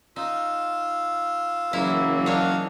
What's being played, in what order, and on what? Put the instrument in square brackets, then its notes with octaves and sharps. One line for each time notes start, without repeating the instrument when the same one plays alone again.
[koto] D#4 [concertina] F4 E6
[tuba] F#1 [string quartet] E3 F#3 A#3 [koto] E4
[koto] D4 D#4 C#5 [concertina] F5 F#5